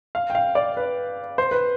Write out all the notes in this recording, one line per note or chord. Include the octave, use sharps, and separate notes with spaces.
F5
G5
F5
D5
B4
C5
B4